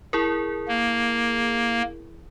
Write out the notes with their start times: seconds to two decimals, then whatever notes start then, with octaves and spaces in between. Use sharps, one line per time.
0.13 E4 G#4 A#4
0.68 A#3